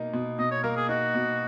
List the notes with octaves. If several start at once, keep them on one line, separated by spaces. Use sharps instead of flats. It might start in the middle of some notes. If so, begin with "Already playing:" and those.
Already playing: B2 A#3 D#4
B2
B2 D#5
C#5
A#3 A#4
G#4
D#4 F#4
B2